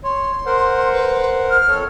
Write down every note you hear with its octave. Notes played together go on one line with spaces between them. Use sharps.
C#5 C6
A#4 C5 F#5
B4
F6
F2 A4 C#5